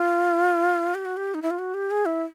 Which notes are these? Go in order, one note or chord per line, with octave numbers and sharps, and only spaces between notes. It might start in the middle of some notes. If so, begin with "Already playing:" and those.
Already playing: F4
G4
F#4
G4
D#4
E4
F4
F#4
G4
G#4
E4